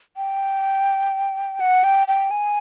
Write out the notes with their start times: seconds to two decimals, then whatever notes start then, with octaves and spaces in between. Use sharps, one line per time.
0.17 G5
1.60 F#5
1.84 G5
2.08 G5
2.31 G#5